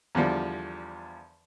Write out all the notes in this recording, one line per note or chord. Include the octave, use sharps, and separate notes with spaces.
E2 D3 F3 G3